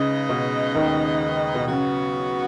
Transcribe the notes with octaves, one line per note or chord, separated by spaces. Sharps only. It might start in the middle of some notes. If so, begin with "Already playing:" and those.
Already playing: C#3 G#3 D#4 B4 D#5
B2
D#2 D#3
B2
C#3 F#3 B3 F#4